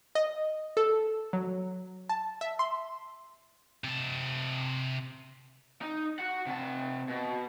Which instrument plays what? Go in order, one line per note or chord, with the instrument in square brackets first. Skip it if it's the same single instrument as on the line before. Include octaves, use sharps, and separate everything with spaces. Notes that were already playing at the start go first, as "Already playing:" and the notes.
[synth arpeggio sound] D#5
A4
F#3
A5
E5
C6
[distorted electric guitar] C3 A5
[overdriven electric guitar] D#4
F#4 F#5
C3 A5
B2